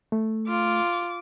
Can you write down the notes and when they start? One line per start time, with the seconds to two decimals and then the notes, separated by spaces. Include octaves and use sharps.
0.12 A3
0.48 F4 D6